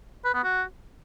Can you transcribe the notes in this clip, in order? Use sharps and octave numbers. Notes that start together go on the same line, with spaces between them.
B4
B3
F#4